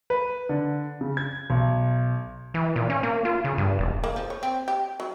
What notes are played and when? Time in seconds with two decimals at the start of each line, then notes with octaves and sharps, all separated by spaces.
0.10 B4
0.49 D3
1.01 C#3
1.17 G#6
1.50 B1
2.54 E3
2.76 A#2
2.90 C#4
3.03 A#3
3.25 F4
3.44 C#3
3.58 G2
3.79 E1
4.04 A#3
4.16 F3
4.30 C#5
4.43 C4
4.68 G4
5.00 F#3